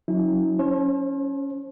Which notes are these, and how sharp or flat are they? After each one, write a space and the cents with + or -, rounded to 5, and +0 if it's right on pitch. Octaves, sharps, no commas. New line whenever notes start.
F#3 -20 C#4 +0 E4 -40
C#4 +0 C5 +45 A5 -45